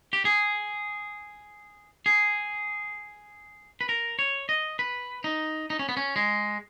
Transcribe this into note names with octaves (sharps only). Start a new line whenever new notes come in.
G4
G#4
G#4
B4
A#4
C#5
D#5
B4
D#4
D#4
C#4
B3
C#4
G#3